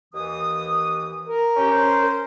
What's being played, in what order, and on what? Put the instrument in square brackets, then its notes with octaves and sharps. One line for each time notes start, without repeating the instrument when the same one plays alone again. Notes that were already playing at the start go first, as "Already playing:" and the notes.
[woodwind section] D#2 E3 D#6
[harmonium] A#4
[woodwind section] C#4 G4
C#4 C5